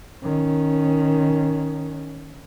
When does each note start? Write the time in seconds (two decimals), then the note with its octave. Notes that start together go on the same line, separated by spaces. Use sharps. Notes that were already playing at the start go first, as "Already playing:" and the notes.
0.23 D#3 C#4